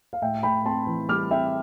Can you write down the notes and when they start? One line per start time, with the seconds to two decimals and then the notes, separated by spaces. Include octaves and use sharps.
0.13 F5
0.22 A2 E5 G5
0.43 A2 G5 B5
0.65 C4 A5 C6
0.87 E3
1.09 G3 D6 F6
1.31 C4 E5 G5